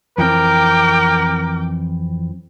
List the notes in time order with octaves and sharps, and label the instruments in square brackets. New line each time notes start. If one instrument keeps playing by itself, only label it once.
[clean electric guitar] F2 E3 C4 [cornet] A#4 [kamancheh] G5 D6